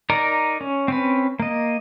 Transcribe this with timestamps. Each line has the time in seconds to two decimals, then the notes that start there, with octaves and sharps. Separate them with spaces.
0.10 D#4 A#4 D5 A#5
0.61 C#4
0.88 C4 C#4 B4
1.40 A#3 D#5